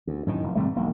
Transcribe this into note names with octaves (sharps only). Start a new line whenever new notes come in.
D2
F#2 A2 D#3
F1
G#1 C3 G3 A3
E1 B1 A#3